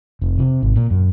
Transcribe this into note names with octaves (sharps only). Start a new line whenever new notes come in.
F1
C3
G#1
A#2
F#2